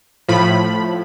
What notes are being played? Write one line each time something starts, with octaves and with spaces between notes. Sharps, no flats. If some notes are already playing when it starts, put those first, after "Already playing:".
A2 F3 B5